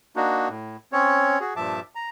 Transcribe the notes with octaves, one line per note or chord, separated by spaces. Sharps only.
A#3 D4 D#4 F#4
A2
C4 C#4 C#5
F#4 G#4
G2 A#2 F3 E5 A5 D6
A#5